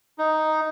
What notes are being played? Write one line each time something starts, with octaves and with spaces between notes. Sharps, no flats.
D#4